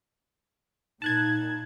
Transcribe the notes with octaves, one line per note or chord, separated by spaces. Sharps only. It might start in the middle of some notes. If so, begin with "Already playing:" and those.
A#2 D#4 A5 F#6 G#6